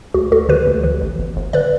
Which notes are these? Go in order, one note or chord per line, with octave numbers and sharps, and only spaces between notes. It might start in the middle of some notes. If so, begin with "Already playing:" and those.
D2 F#4
D2 F#4 A4
D3 G4 B4
D2
E3
A1
G1
G1
D3 B4 D5